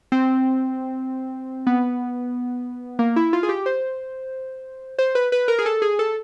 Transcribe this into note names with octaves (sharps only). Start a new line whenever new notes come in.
C4
B3
A#3
E4
F4
G#4
G4
C5
C5
B4
B4
A#4
G#4
A4
G#4
A4